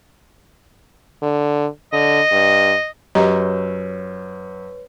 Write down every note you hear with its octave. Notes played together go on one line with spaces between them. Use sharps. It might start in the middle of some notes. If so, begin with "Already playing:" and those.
D3
D3 D#5
G2
F#2 G4 B4 C#5 D#5 A#5